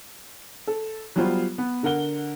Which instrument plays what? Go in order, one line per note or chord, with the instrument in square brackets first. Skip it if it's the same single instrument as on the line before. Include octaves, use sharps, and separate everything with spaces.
[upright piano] A4
F#3 G3 B3 F4 C5
B3
D3 A#4 F#5 G7